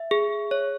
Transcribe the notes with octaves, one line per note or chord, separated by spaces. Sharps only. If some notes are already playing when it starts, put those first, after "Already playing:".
Already playing: E5
G#4
C#5